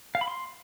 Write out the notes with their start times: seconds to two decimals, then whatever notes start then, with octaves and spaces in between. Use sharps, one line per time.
0.15 F5
0.21 B5
0.28 C6